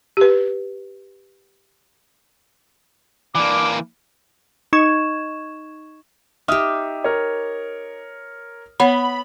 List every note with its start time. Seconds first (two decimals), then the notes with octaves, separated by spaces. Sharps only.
0.17 G4 B4
3.35 E3 A#3 D4 D5 D6
4.73 D#4 D#5 C#6 G#6 E7
6.48 D#4 G4 E5 D#6 F6
7.04 A#4 C#5
8.80 B3 C#5 F#5 B5